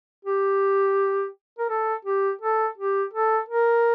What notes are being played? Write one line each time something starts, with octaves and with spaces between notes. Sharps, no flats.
G4
A#4
A4
G4
A4
G4
A4
A#4